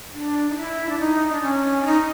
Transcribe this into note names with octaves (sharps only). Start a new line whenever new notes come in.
D4
D#4
E4
D4
D#4
D4
C#4
D4
D#4